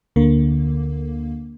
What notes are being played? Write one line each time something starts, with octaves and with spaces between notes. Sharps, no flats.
D2 D3 A#3